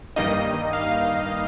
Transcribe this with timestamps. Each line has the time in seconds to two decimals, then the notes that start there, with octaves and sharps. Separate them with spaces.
0.16 G2 D#3 G3 A#3 D#4 D#5
0.73 F5